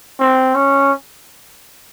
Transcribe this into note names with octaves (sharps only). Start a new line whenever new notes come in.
C4
C#4